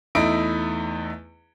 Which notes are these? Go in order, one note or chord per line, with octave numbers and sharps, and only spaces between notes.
E2 A3 D#4 E4 D#5 D7